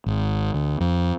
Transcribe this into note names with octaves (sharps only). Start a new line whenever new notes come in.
G#1
D2
F2